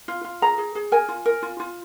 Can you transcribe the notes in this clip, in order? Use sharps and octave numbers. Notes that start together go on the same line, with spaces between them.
F4
F4
G#4 A#5
G#4
G#4
A#4 G#5
F4
A#4
F4
F4